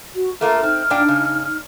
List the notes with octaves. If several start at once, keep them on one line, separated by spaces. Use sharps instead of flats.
F#4
A3 A#3 F4 A4 A#5 F6
C4 D#4 F6
A#2 D4 G5
C#3